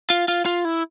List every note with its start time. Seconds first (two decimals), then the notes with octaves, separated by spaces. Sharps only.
0.10 F4
0.28 F4
0.46 F4
0.65 E4